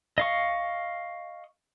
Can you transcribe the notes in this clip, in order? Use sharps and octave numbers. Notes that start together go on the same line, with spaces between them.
D#5 F5 C#6